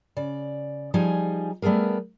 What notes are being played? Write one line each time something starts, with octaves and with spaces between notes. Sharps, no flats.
C#3 D5
F3 G3 D#4 G#4 G#5
G3 A3 B3 G#4 A#4